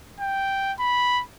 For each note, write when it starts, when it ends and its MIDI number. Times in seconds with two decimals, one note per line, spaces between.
0.20 0.72 79
0.79 1.22 83